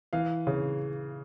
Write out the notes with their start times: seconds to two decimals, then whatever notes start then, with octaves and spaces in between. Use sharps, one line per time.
0.13 E3 F5
0.47 C#3